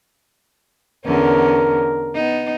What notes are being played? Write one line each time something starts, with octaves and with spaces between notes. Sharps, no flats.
E2 D3 C#4 A#4
B3 D#4